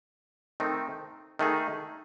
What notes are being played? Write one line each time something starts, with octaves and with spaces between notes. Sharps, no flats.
D#3 A3 C4 D#4
D#3 A3 D#4 G#4